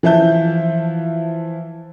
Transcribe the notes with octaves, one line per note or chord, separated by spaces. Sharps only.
E3 F3 E4 E5 A5 G6